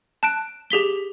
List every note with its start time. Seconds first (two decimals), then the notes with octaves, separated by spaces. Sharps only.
0.23 A5 F#6 D7
0.70 G4 G#4 B6 G7